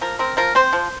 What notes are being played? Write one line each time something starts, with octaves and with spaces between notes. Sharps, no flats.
F3 A#4
C4 A#4
F3 A#4
C4 C5
F3